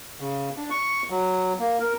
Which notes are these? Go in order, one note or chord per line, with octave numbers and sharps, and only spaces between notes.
C#3
D4
C#6
F#3
A#3
A#4